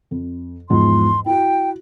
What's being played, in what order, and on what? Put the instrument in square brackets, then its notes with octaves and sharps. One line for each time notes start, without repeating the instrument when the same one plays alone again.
[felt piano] F2
[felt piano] E2 G#2 F3 [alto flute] C6
[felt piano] E4 F#4 [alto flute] G5